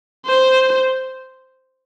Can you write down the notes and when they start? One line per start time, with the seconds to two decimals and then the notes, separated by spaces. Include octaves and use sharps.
0.26 C5